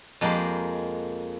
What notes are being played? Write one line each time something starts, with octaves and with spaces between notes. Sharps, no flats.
F2 G#3 A#3 G4 B5